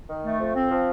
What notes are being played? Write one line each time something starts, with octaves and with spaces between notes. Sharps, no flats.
D#3
A3
F2
C4
F3